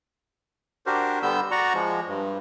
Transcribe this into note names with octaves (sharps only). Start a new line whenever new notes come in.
D4 F#4 G4 A#4 C5
D3 G3 B3 E6 G6
F#4 D5 F#5 A#5 C#6
F3 G#3
G2